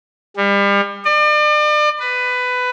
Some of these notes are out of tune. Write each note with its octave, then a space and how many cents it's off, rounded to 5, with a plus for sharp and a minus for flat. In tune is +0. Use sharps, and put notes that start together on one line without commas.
G3 +35
D5 +40
B4 +15